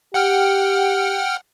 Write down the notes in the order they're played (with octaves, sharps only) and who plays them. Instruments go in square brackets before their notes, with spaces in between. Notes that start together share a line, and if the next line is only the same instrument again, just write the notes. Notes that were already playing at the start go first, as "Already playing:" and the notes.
[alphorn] G4 [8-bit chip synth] F#5 G5 F6